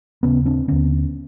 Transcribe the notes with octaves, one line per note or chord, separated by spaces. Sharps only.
D#2 C#3 B3 C#4
C4 D4
D#2 D3 B3 C#4